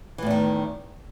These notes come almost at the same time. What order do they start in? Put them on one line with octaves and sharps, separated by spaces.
E3 A2 E2 D#3